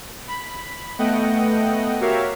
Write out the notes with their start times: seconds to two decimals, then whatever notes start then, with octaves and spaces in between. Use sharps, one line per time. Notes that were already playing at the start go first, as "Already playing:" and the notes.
0.27 B5
0.99 A3 B3 D#5 F#5 G5
2.01 F#4 G4 A#4 C#5 E5 F5